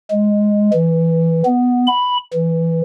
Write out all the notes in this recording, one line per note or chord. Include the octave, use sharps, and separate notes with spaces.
G#3
E3
B3
B5
E3